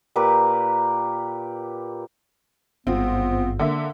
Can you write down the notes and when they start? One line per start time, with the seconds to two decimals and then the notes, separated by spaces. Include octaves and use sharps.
0.16 A#2 G4 A#4 B4
2.87 G#1 G2 B3 C4 F4
3.59 D3 A#3 E5